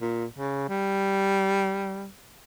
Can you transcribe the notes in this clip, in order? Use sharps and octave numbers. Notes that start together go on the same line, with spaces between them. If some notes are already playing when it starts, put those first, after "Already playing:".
A#2
C#3
G3